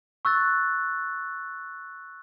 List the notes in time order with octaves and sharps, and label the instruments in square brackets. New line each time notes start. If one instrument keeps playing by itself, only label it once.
[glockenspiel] C#6 E6 F#6 A6